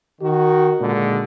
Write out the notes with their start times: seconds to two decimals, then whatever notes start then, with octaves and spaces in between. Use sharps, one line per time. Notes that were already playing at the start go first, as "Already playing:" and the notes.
0.21 D#3 F#4
0.81 A#2 D3 G#3